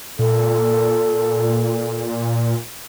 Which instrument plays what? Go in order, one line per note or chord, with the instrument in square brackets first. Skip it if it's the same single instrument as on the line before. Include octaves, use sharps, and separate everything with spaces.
[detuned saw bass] A#2 [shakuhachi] A4